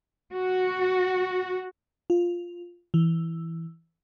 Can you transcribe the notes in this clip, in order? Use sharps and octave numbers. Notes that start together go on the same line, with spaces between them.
F#4
F4
E3